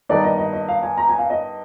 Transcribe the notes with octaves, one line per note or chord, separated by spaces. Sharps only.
G2 D#3 A#3 D#4 D5
D#5
D#5
D#5
F5
G#5
A#5
G#5
F5
D#5